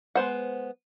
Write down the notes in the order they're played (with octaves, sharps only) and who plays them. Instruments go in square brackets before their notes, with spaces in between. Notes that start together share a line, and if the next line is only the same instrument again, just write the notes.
[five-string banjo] G#3 B3 C5 F#5